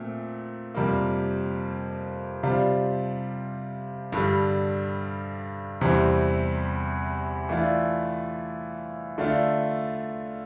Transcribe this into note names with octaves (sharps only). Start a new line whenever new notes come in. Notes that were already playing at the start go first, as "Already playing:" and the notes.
Already playing: A#2 A3 C4
F2 C3 G3 A#3
C3 G3 D4 F4
G2 D3 G3
E2 C3 E3 G3 C4
E3 A3 D4 F4
D3 A3 D4 F4